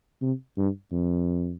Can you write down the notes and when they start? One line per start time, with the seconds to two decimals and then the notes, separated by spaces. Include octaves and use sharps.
0.21 C3
0.57 G2
0.92 F2